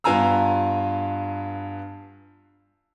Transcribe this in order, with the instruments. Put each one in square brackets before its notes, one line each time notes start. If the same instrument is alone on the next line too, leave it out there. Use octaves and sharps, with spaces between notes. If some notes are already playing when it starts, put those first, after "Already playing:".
[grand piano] G2 B3 F4 G#5 A#5 E6